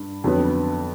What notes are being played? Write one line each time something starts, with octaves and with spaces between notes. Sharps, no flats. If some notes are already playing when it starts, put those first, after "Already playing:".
Already playing: G2
F2 D3 F#3 B3